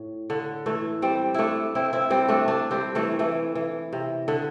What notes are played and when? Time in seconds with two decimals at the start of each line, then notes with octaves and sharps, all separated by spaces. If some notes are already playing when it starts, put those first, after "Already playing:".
Already playing: A2
0.30 D3
0.66 E3 A3
1.02 G3 C4
1.34 A3 D4 E4
1.75 C4 E4
1.93 C4 E4
2.10 G3 C4
2.28 A3 D4
2.48 A3 D4
2.71 G3 C4
2.95 E3 A3
3.19 E3 A3
3.55 E3
3.93 C3
4.28 D3